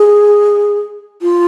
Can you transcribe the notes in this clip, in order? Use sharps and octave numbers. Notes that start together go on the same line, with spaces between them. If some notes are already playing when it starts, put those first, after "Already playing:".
Already playing: G#4
F4